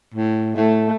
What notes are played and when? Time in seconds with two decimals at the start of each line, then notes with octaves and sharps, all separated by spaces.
0.14 A2
0.56 A2 A3